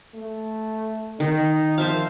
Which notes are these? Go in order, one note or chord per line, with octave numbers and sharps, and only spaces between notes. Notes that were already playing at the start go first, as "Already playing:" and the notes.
A3
D#3 D#4
F3 C5 E5 F5